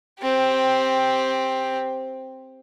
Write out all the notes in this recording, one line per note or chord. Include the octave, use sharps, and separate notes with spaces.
C4 G4